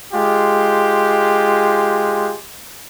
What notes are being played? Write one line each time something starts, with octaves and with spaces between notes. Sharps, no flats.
G#3 F4 G4